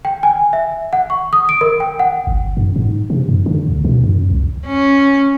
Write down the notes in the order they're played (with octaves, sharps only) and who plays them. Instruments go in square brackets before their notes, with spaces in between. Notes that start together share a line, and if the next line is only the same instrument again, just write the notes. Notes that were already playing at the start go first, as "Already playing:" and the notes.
[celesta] G5
G#5
E5
F#5
C#6
D#6
D7
A#4
G5
F#5
[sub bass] G1
F#2
G#2
C3
F#2
D3
D2
B2
F#2
C2
[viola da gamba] C#4